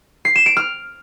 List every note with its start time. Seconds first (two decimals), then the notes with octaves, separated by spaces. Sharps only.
0.25 C7
0.35 E7
0.46 D7
0.57 F6